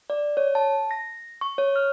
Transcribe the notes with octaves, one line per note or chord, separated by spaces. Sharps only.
D5
C#5
A5
A#6
C#6
C#5
F6